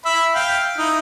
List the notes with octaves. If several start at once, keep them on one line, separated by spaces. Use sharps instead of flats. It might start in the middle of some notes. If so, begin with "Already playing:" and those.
E5 B5
F5 G5
D#4 E4